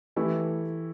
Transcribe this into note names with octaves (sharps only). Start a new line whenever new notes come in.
E3 A3 E4 G4